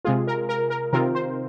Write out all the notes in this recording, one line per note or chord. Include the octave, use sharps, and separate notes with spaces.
C3 G#3 F4 G#4
A#4
A#4
A#4
C3 D#3 C4 F4 A#4
C5